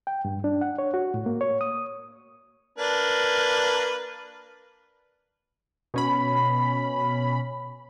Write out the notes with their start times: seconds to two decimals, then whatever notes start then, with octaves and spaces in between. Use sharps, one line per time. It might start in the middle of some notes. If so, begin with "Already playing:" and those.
0.07 G5
0.25 G2
0.44 D4
0.61 F#5
0.78 C#5
0.94 F#4
1.14 A2
1.26 A#3
1.41 C#5
1.61 D#6
2.78 A#3 D4 B4
5.94 B2 C#4 B5